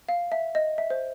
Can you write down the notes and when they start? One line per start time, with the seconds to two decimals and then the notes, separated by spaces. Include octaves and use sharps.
0.09 F5
0.32 E5
0.55 D#5
0.78 E5
0.90 C5